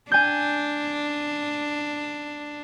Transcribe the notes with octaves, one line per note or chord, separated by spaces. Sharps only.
D4 G#5 G6